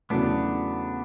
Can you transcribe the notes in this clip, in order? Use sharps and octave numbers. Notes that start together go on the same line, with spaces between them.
E2 C#3 F#3 A3 B3 D4